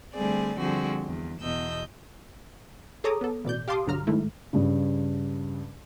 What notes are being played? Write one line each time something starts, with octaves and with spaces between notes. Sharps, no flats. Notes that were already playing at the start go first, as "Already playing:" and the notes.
D3 G3 A3 C4 G#4 D5
D3 F3 G3 C4 F#4 G#4
E2
E2 B2 D#5 E6 G6
G#4 A4 C#5 A#5 D6 D#6
B3 A4
A1 B2 D5 G6
G4 F5 A5 C6 D6 D#6
B1 G2 D3 F#3 A#5 F6
G#2 D#3 G#3 A3 E4
G2 C#3